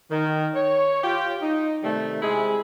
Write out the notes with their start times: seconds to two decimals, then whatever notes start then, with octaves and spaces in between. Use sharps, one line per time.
0.11 D#3
0.54 C#5
1.04 F4 G4
1.41 D#4
1.83 C3 D#3 G3 A3
2.22 C3 G#3 E4 G#4